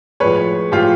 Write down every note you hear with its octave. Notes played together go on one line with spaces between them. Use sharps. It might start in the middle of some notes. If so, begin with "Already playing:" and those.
A2 F3 G#3 B4 C#5
A2 F3 G#3 F4 G4